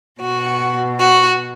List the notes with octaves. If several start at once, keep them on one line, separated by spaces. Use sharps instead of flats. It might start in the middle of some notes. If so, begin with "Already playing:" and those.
B2 F#4
F#4